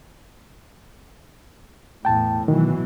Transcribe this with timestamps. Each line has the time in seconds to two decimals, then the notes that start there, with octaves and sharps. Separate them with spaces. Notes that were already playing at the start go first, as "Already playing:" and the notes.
2.05 E2 A2 G5 A5
2.48 B2 D#3 E3 F#3